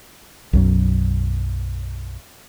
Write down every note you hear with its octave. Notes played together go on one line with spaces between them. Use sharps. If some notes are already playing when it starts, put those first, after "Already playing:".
B1 F#2 F#3